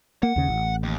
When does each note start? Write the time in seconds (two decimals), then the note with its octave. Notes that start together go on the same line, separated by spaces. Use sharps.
0.23 A#3 F#5
0.36 D#2 C#3
0.49 A1
0.83 D#2